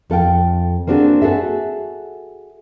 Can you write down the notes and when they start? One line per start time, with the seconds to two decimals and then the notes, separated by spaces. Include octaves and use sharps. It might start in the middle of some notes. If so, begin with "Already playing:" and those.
0.10 F2 A4 F5 G5
0.87 A#3 C4 D4 F#4 G#4
1.22 F#4 G#4 A4 E5